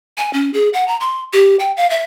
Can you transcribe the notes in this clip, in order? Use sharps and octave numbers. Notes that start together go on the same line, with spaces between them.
G#5
C#4
G#4
F#5
A#5
C6
G4
G5
F5
E5